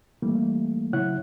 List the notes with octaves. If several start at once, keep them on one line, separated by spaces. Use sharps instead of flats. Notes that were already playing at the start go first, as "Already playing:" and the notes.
E3 G3 A3 A#3
C#3 F#3 E4 C#5 F#5 F#6